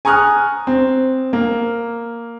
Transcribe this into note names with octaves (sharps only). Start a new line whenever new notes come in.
G#5 A#5 C#6 D#6 F6 F#6
C4
A#3